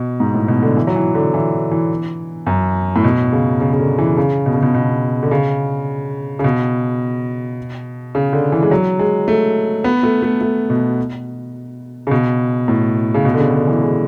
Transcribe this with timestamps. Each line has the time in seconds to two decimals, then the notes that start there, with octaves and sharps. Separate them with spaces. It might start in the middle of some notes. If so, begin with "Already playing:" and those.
Already playing: B2
0.20 G#2
0.34 A2
0.48 B2
0.62 D3
0.77 E3
0.87 F#3
0.96 E3
1.15 D3
1.34 E3
1.71 E3
2.46 F#2
2.96 A2
3.04 B2
3.32 C#3
3.61 C#3
3.73 C#3
3.80 D3
3.98 E3
4.17 C#3
4.46 B2
4.54 C#3
4.62 B2
4.74 B2
5.23 D3
5.31 C#3
6.39 C#3
6.44 B2
8.15 C#3
8.33 D3
8.52 E3
8.63 G#3
8.71 F#3
8.99 G#3
9.28 A3
9.84 B3
10.03 A3
10.22 A3
10.41 A3
10.70 B2
12.07 C#3
12.11 B2
12.68 A2
13.14 C#3
13.25 B2
13.34 D3
13.39 C#3
13.53 D3
13.68 E3
13.82 G#3